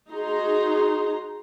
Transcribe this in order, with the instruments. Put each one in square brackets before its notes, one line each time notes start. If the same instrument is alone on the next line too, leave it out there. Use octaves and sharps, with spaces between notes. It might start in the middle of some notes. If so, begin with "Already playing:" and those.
[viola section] D#4 F#4 G#4 A#5 C6